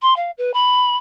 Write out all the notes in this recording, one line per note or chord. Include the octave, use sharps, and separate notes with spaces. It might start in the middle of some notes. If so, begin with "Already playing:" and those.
C6
F5
B4
B5